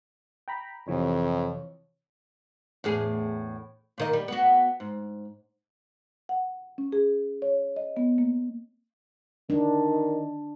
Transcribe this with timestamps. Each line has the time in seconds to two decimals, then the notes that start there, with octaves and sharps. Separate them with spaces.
0.48 G5 A#5 B5
0.88 F2 C3 E3 C#5
2.84 E2 A2 G#4
3.98 A#2 D#3 D#5
4.13 G3
4.28 B3 F#4
4.80 G#2
6.29 F#5
6.78 C#4
6.92 G#4
7.42 C#5
7.76 D#5
7.97 B3
8.18 A#3
9.50 D#3 D4